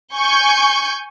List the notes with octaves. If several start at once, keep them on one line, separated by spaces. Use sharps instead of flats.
G#5 C#6 G6